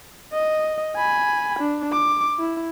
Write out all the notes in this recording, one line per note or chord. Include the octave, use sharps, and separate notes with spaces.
D#5
G#5 B5
D4
D6
E4